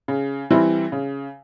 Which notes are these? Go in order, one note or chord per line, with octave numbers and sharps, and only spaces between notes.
C#3
E3 G3 C4 E4
C#3